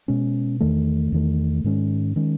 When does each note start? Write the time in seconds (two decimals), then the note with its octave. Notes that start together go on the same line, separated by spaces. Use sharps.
0.08 B2 G#3 C#4
0.60 E2 D#3 A3
1.12 E2 D#3 A3
1.64 G#2 D#3 G#3 C#4
2.16 D#3 G#3 C#4